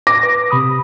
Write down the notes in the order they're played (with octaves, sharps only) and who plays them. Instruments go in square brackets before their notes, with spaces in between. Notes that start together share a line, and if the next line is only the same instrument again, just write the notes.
[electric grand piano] D6 A#6
[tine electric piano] B4
C3 B5 D#6